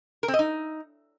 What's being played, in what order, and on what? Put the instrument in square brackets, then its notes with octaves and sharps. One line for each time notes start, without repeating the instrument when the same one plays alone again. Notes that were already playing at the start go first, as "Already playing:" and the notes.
[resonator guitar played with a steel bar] A#4
C4
D#5
D#4